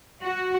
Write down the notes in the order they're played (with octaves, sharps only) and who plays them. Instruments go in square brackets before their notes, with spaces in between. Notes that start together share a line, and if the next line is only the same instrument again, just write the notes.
[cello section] F#4